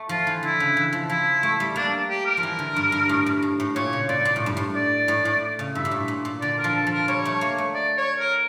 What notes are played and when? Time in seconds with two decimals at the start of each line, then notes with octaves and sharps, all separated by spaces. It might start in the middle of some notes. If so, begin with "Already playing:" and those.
Already playing: A3
0.09 F3 F4
0.27 E3
0.43 D3 E4
0.60 C#3
0.77 E3
0.93 F3
1.10 F3 E4
1.43 A3
1.60 G3
1.76 A#3 D4
2.09 G4
2.26 A#4
2.37 F3
2.43 E3
2.59 D3
2.76 G2
2.92 G2
3.09 A2
3.26 G2
3.42 A2
3.60 A2
3.76 A#2 C#5
3.93 C#3
4.09 A#2 D5
4.25 A#2
4.36 A2
4.46 G2
4.57 A2
4.76 D5
5.08 A2
5.25 A2
5.59 C#3
5.75 G2 E5
5.85 A#2
5.91 A2
6.08 A#2
6.25 A#2
6.41 D3 D5
6.59 A#4
6.64 F3
6.75 A4
6.87 F3
6.92 A#4
7.08 G3 C#5
7.25 A3
7.41 A#3
7.58 A3
7.75 D5
7.97 C#5
8.19 A#4